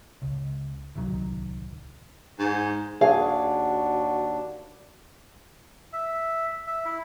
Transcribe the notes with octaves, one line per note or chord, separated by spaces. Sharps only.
C#2
D1 C2 D#3 F#3
G#2
D#2 D4 F#4 G#4 F5 G#5
E5
E5
E4